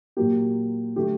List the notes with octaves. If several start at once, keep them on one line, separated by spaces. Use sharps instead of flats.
A#2 F#3 A#3 G4
D3 F#3 A3 G4